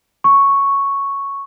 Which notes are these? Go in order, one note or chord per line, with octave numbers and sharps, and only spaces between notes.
C#6